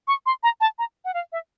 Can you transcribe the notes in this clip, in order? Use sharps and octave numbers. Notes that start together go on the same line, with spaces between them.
C#6
C6
A#5
A5
A#5
F#5
F5
E5